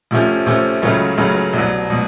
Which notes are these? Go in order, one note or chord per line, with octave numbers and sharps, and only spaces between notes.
D2 C3 F3 A3 C#4
D2 C3 F3 A3 C#4
C#2 C#3 F#3 A3 C#4
C#2 C#3 F#3 A3 C#4
C2 B2 F#3
B2 F#3